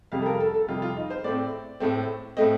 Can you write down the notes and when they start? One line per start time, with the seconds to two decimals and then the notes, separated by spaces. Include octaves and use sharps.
0.12 F2 C3 G3 F5
0.22 A4
0.26 A#4
0.40 A4
0.54 A4
0.68 F2 C3 G3 F4
0.82 F4
0.97 D#4
1.10 C5
1.24 A2 A3 C4 D5
1.80 A2 A3 C4
2.37 A2 A3 C4 D#5